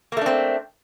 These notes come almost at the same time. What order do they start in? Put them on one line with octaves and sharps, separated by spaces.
A#3 A3 D4 C4